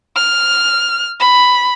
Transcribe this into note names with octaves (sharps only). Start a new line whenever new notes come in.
F6
B5